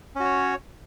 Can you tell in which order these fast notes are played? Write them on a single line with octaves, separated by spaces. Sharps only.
C#4 F#4 C#5